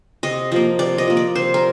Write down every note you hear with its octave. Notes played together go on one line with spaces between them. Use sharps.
C3 D#5
F3 A#3 D#5
C3 D5
D#5
F3 A#3
D5
C3 C5
A#4